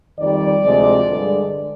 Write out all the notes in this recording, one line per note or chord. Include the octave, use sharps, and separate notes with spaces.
F2 D#3 G3 D5
D2 C3 F3 G#3
G2 D3 G#3